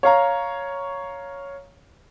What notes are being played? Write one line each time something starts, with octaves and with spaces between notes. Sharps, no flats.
C#5 F5 A#5